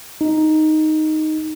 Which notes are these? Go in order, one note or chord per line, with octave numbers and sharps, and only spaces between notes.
D#4